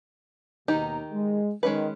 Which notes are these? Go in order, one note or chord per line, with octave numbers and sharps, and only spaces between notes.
D#2 B2 D#3 D#4 G4 A#5
G#3
D#3 G#3 C#4 B4